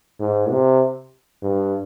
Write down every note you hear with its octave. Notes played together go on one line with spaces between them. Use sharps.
G#2
C3
G2